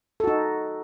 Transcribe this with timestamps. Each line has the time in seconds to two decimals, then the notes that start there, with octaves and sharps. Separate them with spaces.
0.20 A4
0.24 F#4
0.27 D#4